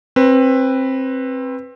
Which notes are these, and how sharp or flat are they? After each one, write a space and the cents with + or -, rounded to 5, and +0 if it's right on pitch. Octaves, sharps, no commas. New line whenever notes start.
C4 +20 B4 +0